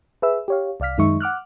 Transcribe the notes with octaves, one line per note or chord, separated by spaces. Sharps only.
G#4 B4 E5 E6
G4 C#5 F5
C2 D5 F5 F6 B6
F#2 D#3 G#3 D#4 E5 C#6
F#5 D6 F6 F#6